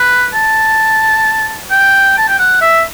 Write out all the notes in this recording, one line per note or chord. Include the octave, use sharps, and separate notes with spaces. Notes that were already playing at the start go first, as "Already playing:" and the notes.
Already playing: B4
A5
G5
A5
G5
F#5
E5